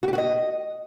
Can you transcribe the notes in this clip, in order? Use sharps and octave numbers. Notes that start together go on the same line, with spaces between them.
F#4
G4
F#4
D#5